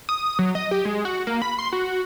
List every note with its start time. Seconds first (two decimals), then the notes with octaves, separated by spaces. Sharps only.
0.09 D#6
0.39 F#3
0.55 D#5
0.71 G4
0.85 G#3
1.05 F#4
1.27 A#3
1.42 B5
1.59 C6
1.73 F#4